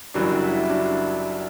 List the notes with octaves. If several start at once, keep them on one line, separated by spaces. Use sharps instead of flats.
F#1 F#2 E3 G3 D4 F#4
E4
D4 F#4